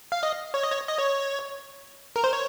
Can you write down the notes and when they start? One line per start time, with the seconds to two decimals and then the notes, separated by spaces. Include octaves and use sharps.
0.12 F5
0.23 D#5
0.54 C#5
0.63 D#5
0.72 C#5
0.88 D#5
0.98 C#5
2.16 A#4
2.24 C5
2.33 C#5